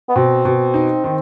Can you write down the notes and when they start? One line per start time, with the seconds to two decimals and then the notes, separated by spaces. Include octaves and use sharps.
0.09 B3
0.16 B2 C4
0.45 B2
0.74 D#4
1.04 D#3